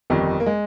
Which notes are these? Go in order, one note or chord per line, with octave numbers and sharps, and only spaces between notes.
G1 F2 D#3 G3 D#4
A#3
G#3